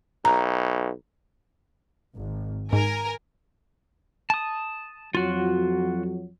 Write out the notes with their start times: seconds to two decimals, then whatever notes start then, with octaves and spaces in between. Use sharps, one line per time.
0.25 B1 A#5
2.16 G#1
2.73 G#2 A#4 G#5
4.30 A5 D#6
5.15 F2 F#3 F4 F#4